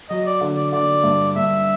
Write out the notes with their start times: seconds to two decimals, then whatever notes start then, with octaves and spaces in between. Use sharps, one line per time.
0.09 F#3 D#5
0.26 D5
0.41 D3
0.56 D5
0.72 D3 D5
1.04 G2
1.36 G2 E5